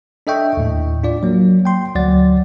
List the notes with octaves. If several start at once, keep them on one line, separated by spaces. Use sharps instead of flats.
D4 A4 D#5 E5 G5 C#6
D#2 A2
D4 F4 D5
F#3 A#3
G5 C6
D2 F#3 D5 F#5 A6